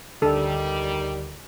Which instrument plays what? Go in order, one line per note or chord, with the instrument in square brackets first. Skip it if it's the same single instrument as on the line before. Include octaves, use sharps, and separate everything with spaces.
[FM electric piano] D2 D3 [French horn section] D#3 G3 [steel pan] A4